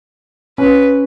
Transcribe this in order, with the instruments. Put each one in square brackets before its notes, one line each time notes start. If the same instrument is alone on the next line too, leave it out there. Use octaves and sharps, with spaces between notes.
[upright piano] C#4 [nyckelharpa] B4